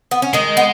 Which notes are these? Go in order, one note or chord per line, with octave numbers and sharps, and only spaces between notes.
B3
C#4
D#3 G#3 D#4
B3